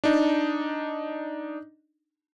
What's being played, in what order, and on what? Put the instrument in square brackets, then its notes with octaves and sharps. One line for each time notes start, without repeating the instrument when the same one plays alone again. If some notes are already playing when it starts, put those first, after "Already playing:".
[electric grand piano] D4 D#4